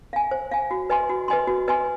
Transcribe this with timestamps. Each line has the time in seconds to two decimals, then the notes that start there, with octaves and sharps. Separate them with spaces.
0.13 F5 G#5
0.31 C5
0.52 F5 G#5
0.71 F#4
0.90 B4 D#5 G#5 C6
1.09 F#4
1.28 B4 D#5 G#5 C6
1.48 F#4
1.68 B4 D#5 G#5 C6